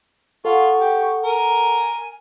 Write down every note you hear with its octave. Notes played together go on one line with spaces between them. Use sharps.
F4 A4 F#5 C#6
G4
A#4 G#5